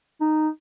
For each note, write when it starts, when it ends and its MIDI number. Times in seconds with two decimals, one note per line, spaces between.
0.20 0.48 63